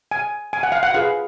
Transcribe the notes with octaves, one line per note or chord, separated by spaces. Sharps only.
G#5
G#5
F#5
F5
F#5
F4 G#4 B4 F5